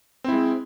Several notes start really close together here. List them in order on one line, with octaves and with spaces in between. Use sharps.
C4 E4 G#3